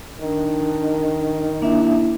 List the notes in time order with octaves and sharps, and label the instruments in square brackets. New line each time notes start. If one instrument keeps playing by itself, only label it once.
[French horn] D#3 [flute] D4
[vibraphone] A#3 D4 E5 [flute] E4